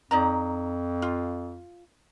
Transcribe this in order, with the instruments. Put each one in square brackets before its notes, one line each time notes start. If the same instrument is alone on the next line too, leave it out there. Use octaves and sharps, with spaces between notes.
[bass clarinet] F2 [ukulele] D#4 D5 A#5
[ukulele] F4